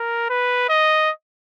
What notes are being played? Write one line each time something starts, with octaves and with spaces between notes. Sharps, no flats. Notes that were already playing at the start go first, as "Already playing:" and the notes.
Already playing: A#4
B4
D#5